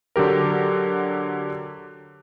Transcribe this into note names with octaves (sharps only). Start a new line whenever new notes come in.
D3 F#3 G4 A#4